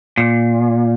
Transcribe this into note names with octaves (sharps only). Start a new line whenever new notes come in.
A#2